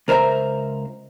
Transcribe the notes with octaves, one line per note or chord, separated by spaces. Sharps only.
C#2 A#4 C5 E5 A#5